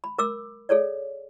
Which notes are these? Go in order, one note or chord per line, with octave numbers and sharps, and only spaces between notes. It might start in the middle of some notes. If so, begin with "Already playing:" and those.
B5
A#4 D6 E6
G#4 A4 C#5 D5